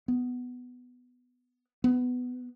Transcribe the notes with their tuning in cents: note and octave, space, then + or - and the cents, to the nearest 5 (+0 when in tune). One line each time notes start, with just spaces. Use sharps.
B3 +10
B3 +15